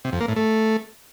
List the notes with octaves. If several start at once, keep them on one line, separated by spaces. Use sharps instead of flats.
C3
F2
A#3
A2
A3